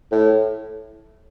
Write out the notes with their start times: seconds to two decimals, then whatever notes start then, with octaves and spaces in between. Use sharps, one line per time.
0.12 A2